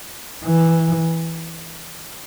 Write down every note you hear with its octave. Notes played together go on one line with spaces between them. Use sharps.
E3